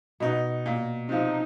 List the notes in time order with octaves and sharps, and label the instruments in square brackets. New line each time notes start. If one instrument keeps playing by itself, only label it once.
[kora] B2 [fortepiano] B3 D#4
[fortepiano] A#2
[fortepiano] C3 F3 [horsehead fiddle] D#4